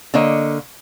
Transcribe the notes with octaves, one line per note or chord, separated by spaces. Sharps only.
D3 A#3 C#5 D#5